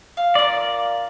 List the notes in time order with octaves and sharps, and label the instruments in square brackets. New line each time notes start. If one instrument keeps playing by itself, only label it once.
[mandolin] F5
[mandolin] F4 A#4 [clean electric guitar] D5